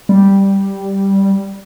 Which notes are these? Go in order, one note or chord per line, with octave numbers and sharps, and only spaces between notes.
G3